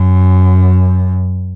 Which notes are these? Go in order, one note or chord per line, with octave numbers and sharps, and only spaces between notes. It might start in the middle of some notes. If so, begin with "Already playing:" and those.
Already playing: F#2